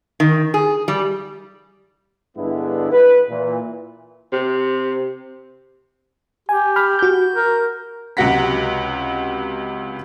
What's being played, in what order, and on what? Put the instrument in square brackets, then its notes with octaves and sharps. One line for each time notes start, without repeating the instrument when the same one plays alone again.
[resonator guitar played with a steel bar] D#3
G#4
G3
[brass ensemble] G2 D3 G#3 B3 D4 E4
B4
A#2 E3
[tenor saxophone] C3
[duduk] G4 [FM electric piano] G#5
[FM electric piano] B5 F6
F#4 G6
[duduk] A#4
[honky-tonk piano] C#2 C3 F#3 F#5 A#6 B6